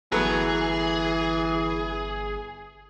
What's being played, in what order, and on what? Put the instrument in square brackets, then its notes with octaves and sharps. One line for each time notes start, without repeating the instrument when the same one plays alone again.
[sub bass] G1 [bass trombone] E3 [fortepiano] F#3 A3 B3 [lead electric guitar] G#4